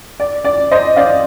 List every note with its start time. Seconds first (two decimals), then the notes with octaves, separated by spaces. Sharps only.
0.20 D5
0.45 D5
0.71 C5 D#5
0.96 D5 F5